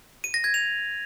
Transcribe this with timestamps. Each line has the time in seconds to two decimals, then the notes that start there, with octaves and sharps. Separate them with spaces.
0.24 D#7
0.34 A#6
0.44 G#6
0.54 F7